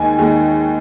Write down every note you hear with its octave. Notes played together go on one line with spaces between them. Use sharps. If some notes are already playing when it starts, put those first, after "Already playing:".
Already playing: D#2 D#3 G#3 G#5
D#2 D#3 G#3